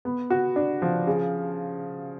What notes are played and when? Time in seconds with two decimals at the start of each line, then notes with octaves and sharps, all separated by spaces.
0.05 B3
0.30 F#4
0.56 D4
0.82 F3
1.07 C#3